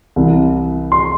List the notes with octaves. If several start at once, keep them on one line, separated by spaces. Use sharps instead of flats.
C2 C3 E3
C6